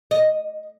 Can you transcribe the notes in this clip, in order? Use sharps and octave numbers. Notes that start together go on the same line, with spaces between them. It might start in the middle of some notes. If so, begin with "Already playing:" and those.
D#5